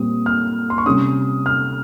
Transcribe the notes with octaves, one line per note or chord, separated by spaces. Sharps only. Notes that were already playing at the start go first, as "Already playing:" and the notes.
Already playing: A#2 G3 C4 D#6
F6
C6
C#6
C3 G3 C#4 D#6
F6